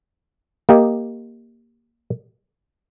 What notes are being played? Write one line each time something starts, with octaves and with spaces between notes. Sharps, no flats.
A#3 G4 D#5